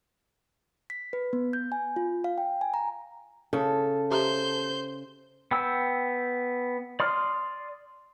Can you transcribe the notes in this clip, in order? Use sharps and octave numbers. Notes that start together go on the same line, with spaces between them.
B6
B4
B3
G6
G#5
F4
F5
G5
G#5
A#5
C#3 A4
G4 C5 E5 A#5 G6
B3 G5 E6
D5 C6 D#6 F6